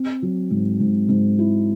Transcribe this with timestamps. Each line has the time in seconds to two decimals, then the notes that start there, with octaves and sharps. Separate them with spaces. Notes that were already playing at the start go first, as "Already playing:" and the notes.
Already playing: C4
0.22 F#3
0.51 G#2
0.80 G#2
1.09 G#2
1.39 E4